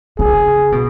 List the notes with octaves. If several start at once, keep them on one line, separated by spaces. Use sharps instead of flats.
C#3 G#4
B2